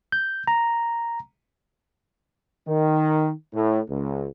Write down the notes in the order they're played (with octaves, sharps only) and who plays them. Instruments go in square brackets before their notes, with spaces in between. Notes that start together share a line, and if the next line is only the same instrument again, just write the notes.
[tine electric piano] G6
A#5
[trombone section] D#3
A2
C#2